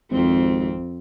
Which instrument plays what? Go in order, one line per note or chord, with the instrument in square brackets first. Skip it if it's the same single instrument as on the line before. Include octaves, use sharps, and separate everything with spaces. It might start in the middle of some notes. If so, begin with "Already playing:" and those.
[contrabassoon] G#1 [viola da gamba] F2 C4